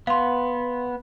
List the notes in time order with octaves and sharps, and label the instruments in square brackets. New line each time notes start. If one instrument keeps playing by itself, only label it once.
[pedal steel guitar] B3 [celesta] F5 C6